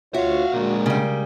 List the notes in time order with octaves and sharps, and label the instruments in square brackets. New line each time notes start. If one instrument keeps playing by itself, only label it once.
[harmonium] D2 F4 C#5 [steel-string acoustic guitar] F#4 [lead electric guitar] E5 F5
[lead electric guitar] A#2 D3 [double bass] G#3 [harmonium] A#4
[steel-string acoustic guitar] C#3 G3